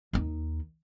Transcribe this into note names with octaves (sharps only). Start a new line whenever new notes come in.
D#2 D#4